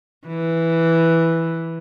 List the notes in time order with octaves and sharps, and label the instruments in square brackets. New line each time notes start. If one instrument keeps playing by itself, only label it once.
[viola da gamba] E3